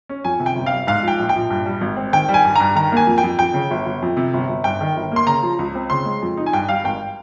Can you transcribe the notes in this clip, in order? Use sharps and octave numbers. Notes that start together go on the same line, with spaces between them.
C#4
F2 G#5
C3
G5
G1
F5
G3
G#2 F5
F3 G5
A#1
G5
A#1
G2
G3
G#1
C4
D#3 G5
G3
G#5
G2
G2 A#5
D#3 A#5
A#3 G#5
F2
G5
F2
F2 G5
C#3
G1
G1
F2
C3
G1
G1
G2 G5
D#3
G1
A#3 C6
C#3 A#5
F3
C#2
C4
C#3 C6
G#3
F2
D#4
G#5
G2 G5
G3 F5
G#1 G5